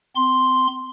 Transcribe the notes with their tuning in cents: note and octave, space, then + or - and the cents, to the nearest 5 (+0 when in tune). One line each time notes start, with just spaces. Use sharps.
C4 -30 C6 +0